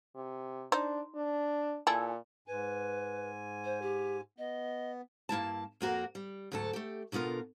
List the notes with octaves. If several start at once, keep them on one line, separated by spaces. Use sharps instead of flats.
C3
D4 D#4 C5
D4
A#2 E4 G#4 A4
G#2 B4 G#5
C5
G4
B3 D#5
G2 A#3 E4 A5
F2 A#3 F#4 A#4
G3
D2 G#2 F#3 A4 A5
A3 G4
B2 D3 B3 F4 A#4